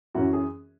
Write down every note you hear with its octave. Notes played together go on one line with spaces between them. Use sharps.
F#2 E3 C#4 F#4
G#4